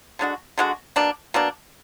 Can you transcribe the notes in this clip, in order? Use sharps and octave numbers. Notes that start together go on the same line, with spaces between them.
D3 G#3 D4 F#4
D3 G#3 D4 F#4
B2 A#3 D4
B2 A#3 D4